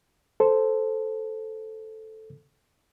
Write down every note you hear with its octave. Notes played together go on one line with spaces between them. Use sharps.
A4 C5